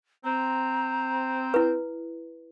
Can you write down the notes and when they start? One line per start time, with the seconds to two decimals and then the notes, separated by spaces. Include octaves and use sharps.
0.25 C4 A#5
1.54 E4 B4